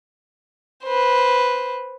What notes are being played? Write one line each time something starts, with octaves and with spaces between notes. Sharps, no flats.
B4 C5